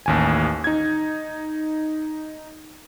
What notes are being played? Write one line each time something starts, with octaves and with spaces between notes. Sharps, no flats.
A1 D#2 G#5
D#4 G#6